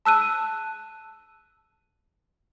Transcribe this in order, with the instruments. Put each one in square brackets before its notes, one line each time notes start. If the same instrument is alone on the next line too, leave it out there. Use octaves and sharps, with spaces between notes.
[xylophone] A5 E6 F#6 D#7